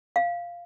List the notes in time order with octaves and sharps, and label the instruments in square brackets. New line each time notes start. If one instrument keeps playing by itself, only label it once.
[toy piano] F5